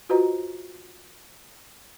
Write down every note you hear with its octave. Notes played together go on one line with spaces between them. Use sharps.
F4 F#4 B4 C5 D#5 A#5